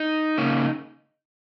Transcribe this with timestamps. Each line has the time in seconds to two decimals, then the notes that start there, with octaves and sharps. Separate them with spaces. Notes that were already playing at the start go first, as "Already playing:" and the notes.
Already playing: D#4
0.38 C#3 A#3 C#4